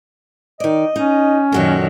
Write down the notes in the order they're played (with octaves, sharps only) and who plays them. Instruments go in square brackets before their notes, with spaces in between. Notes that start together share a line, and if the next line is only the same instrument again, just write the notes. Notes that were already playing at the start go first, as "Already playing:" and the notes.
[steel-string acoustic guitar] D#3 D5 [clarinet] D#5
[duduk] C#4 [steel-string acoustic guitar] D#4
[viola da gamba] F#2 D#3 [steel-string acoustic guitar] A#2 F#4 A4